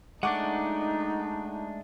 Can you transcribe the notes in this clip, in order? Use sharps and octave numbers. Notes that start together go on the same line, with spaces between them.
G#3 A3 D4 D#4 F#5 C#6 D6